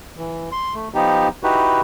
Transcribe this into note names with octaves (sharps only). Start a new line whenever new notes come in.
E3
C6
A3
F3 B3 D#4 G4
D#4 E4 F#4 G4 B4